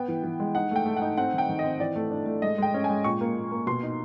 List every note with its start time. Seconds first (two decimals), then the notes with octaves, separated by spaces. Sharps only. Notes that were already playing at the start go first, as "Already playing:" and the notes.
Already playing: B3 G5
0.08 E3
0.24 E3
0.40 G#3
0.55 D#4 F#5
0.71 A3 G5
0.86 A3
0.97 D#4 F#5
1.17 C4 F#5
1.34 D#3 G5
1.49 D#3
1.59 D#5
1.64 C4
1.80 E3 D5
1.96 A3
2.11 D4
2.26 A3
2.42 G#3 D#5
2.58 G#3 G5
2.74 C#4
2.84 G#5
2.90 G#3
3.04 A#2 C#6
3.21 A#3
3.36 A#2
3.52 A#3
3.67 B2 C6
3.83 D#4